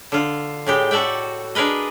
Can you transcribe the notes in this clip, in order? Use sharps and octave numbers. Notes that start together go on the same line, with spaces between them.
D3 F4
A2 G#3 G4
F#4 A4 D5 E5 G5
D4 G#4 A#4 B4 D#5